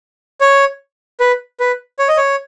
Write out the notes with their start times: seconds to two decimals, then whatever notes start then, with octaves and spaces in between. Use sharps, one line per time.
0.41 C#5
1.20 B4
1.60 B4
1.99 C#5
2.08 D#5
2.17 C#5